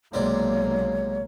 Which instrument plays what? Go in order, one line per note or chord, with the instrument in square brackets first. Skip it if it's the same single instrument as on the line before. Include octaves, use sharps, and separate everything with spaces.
[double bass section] B1 A#3 [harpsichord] G#2 C3 D5 [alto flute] C#5